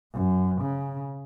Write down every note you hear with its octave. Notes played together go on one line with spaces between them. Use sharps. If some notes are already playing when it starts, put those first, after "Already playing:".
F#2
C#3